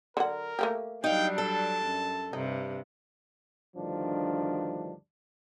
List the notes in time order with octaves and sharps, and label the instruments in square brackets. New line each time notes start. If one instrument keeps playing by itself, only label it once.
[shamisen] D3 F#3 F#5 [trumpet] A#4
[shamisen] A3 A#3 G4
[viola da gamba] F#3 G3 D4 [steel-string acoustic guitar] D#4 F5 [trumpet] G5
[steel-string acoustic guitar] A4 [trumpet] A5
[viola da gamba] F#2
[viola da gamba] G2 C3 [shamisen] D#4
[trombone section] D2 G2 D#3 F3 D4